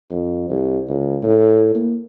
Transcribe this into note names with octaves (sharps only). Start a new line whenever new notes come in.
F2
C2
C#2
A2
A#3